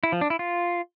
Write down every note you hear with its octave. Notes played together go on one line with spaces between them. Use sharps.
E4
F3
D4
E4
F4